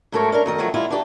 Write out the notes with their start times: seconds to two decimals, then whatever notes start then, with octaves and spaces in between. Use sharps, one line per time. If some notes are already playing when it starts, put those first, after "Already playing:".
0.12 G#2 F#3 A3 A4 A#4 C#5
0.32 C#4 D4 A#4 A#5
0.46 F#2 D#3 D#5
0.58 C3 D#3 F3 F#3 A3 F4
0.74 G3 G#3 E4 F4
0.90 D4 D#4 F#4 G4 A4 D5